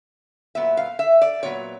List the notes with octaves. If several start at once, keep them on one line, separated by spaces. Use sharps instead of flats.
A#2 F#3 B3 E5
F5
E5
D5
A#2 F#3 B3 C#5